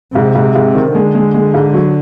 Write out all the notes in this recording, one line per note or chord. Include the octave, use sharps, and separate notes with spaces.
G#2 C3
G#2
G#2
D#3
D3 G#3
G#3
G#3
G#2
F#3